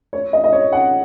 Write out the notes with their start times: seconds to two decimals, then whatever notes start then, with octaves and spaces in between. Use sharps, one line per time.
0.13 C#5
0.33 D#5
0.44 D#5
0.53 C#5
0.72 F#5